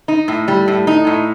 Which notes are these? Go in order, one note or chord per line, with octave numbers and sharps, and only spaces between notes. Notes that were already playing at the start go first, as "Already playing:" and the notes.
D#4
A2
G3
A2
D#4
A2